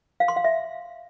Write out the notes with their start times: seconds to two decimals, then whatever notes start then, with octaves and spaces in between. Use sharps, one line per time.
0.20 F5
0.28 C6
0.36 F5
0.44 E5